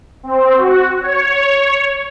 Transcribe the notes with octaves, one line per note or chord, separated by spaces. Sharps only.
C4
F#4
C#5